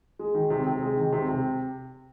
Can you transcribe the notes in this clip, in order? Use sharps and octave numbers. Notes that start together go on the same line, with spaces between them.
G#3
D#3
C3
C3
G#3
D#3
C3
C3